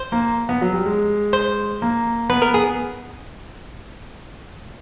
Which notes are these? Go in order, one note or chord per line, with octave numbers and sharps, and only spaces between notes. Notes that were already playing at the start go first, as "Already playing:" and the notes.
Already playing: C5
A#3
B3
F#3
G3
G#3
C5
A#3
B3 B4
A#4
B3 G#4